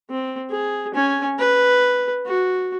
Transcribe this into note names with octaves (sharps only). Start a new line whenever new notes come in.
C4
G#4
C#4 G#5
B4
F#4